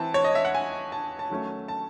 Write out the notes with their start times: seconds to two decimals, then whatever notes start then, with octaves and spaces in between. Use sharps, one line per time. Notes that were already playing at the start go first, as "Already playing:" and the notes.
Already playing: E3 C4 A5
0.14 C#5
0.24 D#5
0.35 E5
0.45 F#5
0.55 G#5
0.92 A5
1.19 A5
1.30 D#3 F#3 A3 C#4
1.68 A5